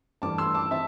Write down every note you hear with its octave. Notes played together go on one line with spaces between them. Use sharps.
G2 E3 A3 A5 D6
C6 E6
A5 D6
C4 E5 A5